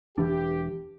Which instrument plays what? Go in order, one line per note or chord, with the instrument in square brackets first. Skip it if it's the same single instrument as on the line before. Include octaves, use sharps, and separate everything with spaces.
[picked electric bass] E1 E3 D4 [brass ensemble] G4